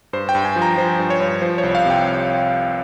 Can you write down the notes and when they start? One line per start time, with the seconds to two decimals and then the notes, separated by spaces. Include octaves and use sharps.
0.13 G2 C5
0.29 G5
0.35 G2
0.45 G#5
0.56 F3
0.62 A#5
0.77 F3 C5
0.99 G2
1.10 C#5
1.20 G2
1.42 F3 C5
1.58 C#5
1.63 C2
1.75 F5
1.85 C3 G5